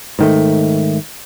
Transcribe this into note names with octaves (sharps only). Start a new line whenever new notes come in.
G#2 D#3 A3